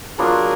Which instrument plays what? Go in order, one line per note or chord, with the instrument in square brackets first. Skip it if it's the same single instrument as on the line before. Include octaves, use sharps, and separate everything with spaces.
[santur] F#3 B3 D4 F4 [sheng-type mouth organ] G#4 A#4